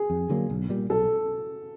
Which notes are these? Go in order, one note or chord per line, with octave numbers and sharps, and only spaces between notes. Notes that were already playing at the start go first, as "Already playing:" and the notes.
Already playing: G#4
F2
D3 F#3 A#3
B1
A#2 G3
B1 A4